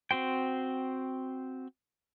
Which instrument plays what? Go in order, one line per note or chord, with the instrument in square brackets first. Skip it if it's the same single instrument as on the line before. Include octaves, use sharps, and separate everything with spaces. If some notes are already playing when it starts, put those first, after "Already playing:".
[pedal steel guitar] C4 F#4 C5 G5